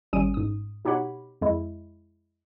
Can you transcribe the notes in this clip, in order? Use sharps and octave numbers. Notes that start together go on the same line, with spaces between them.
G#1 G3 C#4 D#6 D7 D#7
G#2 D#6
B2 D#4 G4 C#5 F#5 B5
F2 G#3 E4